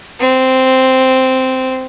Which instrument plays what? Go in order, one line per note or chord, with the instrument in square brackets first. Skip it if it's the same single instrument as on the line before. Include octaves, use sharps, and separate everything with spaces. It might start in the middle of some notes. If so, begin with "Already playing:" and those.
[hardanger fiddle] C4